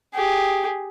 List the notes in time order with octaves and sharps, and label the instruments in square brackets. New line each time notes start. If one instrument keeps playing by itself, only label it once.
[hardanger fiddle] G4 G#4